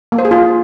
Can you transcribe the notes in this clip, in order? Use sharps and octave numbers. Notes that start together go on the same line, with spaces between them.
A#3
C5
G#4
F4